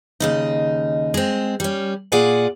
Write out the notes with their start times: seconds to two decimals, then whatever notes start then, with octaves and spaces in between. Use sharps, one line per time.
0.20 D#2 C#3 D#4
1.14 G#3 C4
1.60 G3 C#4
2.12 A#2 F4 G#4 D5 F#5 G#5